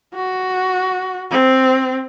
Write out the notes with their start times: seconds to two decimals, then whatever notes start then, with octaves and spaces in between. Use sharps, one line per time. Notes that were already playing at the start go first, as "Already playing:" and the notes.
0.15 F#4
1.31 C4